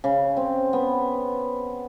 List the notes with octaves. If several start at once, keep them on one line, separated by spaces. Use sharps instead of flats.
C#3
C4
B3